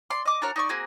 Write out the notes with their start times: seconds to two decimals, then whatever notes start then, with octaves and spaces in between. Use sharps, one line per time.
0.10 D5 C6
0.25 D#5 D6
0.42 D4 F#4 A#4 C#5
0.56 D#4 D5 C#6
0.69 A#3 C4 F#4 G#4